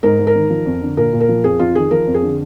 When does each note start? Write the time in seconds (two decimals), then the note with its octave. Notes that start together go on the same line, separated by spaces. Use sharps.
0.03 G#2 A#4
0.19 G#2
0.27 A#4
0.35 D#3
0.50 F3
0.66 F2
0.81 D3
0.97 A#2 A#4
1.13 A#2
1.20 A#4
1.29 F3
1.44 F2 G#4
1.59 F2 F4
1.75 D#3 G#4
1.91 F3 A#4
2.07 F2
2.14 G#4
2.22 D3